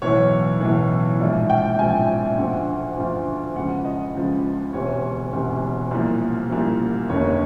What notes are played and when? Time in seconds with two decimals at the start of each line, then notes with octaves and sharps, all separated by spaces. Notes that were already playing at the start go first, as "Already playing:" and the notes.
0.02 B1 A2 E3 C#5
0.61 B1 A2 E3
1.20 A#1 G#2 F3 D5
1.50 G5
1.79 A#1 G#2 F3 G#5
2.38 D2 D3 F3 F#5
2.97 D2 D3 F3
3.56 C#2 C#3 F3 F#5
3.85 D#5
4.14 C#2 C#3 F3
4.73 E1 D2 C3 C#5
5.33 E1 D2 C3
5.91 C2 A#2 F3
6.50 C2 A#2 F3
7.09 F1 D#2 D3 C#5